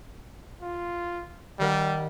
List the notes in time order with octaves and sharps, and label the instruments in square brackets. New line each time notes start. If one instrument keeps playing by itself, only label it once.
[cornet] F4
[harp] D#3 A#4 F#5 [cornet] G3